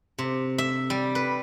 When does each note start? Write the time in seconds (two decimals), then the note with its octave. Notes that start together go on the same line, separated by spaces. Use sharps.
0.18 C3
0.58 E5
0.90 G3
1.15 B4